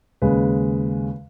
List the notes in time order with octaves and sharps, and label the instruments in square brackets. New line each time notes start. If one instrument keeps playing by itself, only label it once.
[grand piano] D#2 C#3 G#3 B4